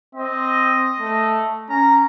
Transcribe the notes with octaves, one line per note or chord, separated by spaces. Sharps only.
C4 D#5
A3
C#4 A#5